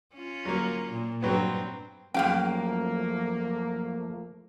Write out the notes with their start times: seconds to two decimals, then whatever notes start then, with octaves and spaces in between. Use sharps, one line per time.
0.14 C#4 F4
0.45 F#3 A#3
0.91 A#2
1.23 G2 F#3 B3 C4
2.14 F#2 F3 A3 A#3 C#4 G#4 F5 G5